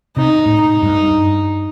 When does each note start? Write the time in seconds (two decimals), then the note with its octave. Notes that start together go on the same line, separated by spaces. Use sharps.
0.17 C3 D#4
0.46 A2
0.60 D#4
0.82 G2
1.04 G2